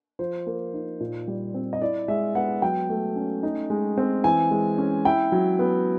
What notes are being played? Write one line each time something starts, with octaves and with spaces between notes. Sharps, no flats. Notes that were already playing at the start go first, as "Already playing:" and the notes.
F3 C5
A#3
D#4
A#2
G3
C4
D#5
E4 D5
G#3 E5
B3 F#5
F#3 G5
A3
C#4
D#4
G#3
C4
E3 G#5
G#3
C#4
E4 G5
F#3
B3